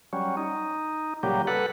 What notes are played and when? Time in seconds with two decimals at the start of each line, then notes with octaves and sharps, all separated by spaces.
0.13 F#3 G3 C#4
0.37 D#4
1.23 A#2 C#3 F#3 G3 A#3 G4
1.47 A4 B4 F#5